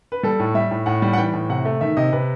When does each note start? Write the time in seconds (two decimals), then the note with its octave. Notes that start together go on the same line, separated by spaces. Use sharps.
0.12 B4
0.23 G3 A4
0.40 A2
0.55 G3 E5
0.71 A2
0.86 A2 F#5
1.02 G3
1.13 F#5
1.18 E3 G5
1.34 A2
1.49 C3 F#5
1.65 A3
1.81 D#3 E5
1.97 C3 D#5
2.12 C3 B4